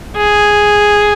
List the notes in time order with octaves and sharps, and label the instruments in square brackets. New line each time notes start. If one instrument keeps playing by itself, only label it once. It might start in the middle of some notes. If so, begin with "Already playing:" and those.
[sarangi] G#4